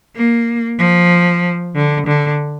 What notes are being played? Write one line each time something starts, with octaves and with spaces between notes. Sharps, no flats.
A#3
F3
D3
D3